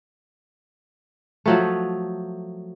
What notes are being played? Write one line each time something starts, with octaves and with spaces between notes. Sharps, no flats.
F3 F#3 A3